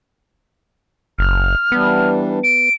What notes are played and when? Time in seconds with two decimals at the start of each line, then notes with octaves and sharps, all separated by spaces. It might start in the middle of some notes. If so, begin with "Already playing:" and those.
1.19 F#1 F6
1.72 E3 G3 B3 D4
2.44 D7